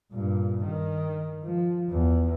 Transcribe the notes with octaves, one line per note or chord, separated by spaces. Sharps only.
G2 A#2
D#3
F3
E2